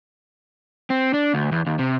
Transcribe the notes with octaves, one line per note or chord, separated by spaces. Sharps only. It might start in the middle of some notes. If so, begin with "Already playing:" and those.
C4
D4
D2
E2
D#2
C3